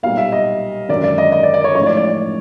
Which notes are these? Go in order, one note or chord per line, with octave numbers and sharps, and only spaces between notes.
B1 A#2 G3 F5
E5
D#5
G#1 F#2 D3 D5
D5
D#5
D#5
D5
D5
C#5
A1 G#2 F3 C#5
D5
D5
D5